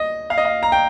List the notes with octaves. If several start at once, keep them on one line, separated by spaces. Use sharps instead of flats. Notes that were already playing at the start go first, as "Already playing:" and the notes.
Already playing: D#5
F5
D#5
F5
A#5
G5